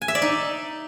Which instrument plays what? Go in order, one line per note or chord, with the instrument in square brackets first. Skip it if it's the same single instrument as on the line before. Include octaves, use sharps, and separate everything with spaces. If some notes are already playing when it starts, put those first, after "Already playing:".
[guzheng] G#5
E5
D5
D#4